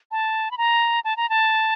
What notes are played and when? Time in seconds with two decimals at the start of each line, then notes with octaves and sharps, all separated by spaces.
0.11 A5
0.51 B5
0.58 A#5
1.05 A5
1.17 A#5
1.30 A5